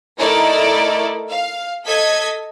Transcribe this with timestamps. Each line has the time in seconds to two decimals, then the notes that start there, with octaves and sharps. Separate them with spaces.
0.18 A3 D#4 E4 A4 A#4 D5
1.28 F5
1.85 A4 D#5 G#6 B6